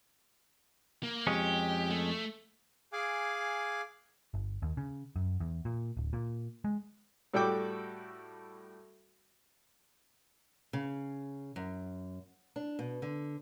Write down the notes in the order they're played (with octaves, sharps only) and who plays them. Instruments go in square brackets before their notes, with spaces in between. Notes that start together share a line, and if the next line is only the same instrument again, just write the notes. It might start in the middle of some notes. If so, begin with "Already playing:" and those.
[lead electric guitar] A#3
[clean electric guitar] F2 G#3 C#4 [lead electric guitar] G4
[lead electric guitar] A3
[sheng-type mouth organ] G#4 F5 G#5 D6 F#6
[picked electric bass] G1
D#2
C#3
F#2
E2
A#2
D1
A#2
G#3
[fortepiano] A2 G3 F#4 A4 G5 D6
[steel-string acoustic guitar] C#3
F#2
D4
B2
D3